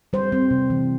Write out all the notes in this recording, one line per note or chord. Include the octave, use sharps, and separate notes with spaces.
G3 C5
C4
C3
E3